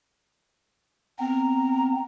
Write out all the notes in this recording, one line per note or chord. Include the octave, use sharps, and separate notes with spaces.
B3 C4 A#5